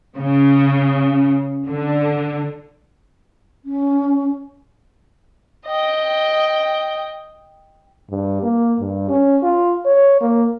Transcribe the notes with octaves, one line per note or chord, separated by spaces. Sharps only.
C#3
D3
C#4
D#5 G5
G2
A#3
G2
C#4
F4
C#5
A#3